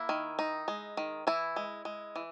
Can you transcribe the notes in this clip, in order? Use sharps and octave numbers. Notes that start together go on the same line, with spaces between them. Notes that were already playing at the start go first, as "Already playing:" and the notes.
Already playing: A#3 E4
D#3
D#4
G#3
D#3
E3 E4
G#3
G#3
E3